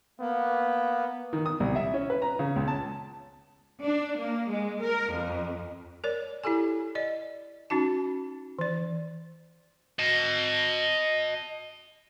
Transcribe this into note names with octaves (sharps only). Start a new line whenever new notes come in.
A#3 B3
D#3
D#6
C2
E5
C#4
B4
A#5
C#3
C#2
A5
D4
A#3
G#3
A#4
F2
A#4 C#5 D5
E4 G4 A4 G#5
D5 D#5
C#4 D#4 F#4 A5
E3 D5
D#5 A5